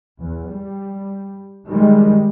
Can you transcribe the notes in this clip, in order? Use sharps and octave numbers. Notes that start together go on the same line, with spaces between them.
E2
G3
D#3 G3 G#3